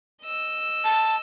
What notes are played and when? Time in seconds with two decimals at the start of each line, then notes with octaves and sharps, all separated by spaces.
0.23 D#5 E6
0.84 A5